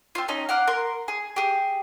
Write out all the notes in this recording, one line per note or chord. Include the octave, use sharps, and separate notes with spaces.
C4 F4
C#4 D#4 D#5
F5 F#5 D6 F6
A#4 C6
G#4
G4 G#4